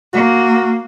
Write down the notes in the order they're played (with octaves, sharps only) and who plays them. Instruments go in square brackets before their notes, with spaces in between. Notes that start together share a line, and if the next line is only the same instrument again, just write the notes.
[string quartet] A#3 [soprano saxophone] F#4